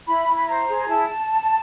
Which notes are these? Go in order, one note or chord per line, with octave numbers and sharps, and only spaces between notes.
E4 B5
E4
B5
C5 A#5
G#4
E4 A5